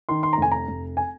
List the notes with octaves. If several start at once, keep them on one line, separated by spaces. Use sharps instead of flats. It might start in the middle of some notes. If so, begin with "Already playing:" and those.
D#3 C6
C6
A#5
F1 G#5
A#5
F1
G#5